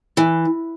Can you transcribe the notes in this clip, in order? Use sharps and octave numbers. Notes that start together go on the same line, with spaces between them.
E3